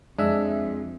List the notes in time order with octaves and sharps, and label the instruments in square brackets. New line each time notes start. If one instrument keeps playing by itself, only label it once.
[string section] F2 [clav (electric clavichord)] G#3 [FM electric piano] D4 E5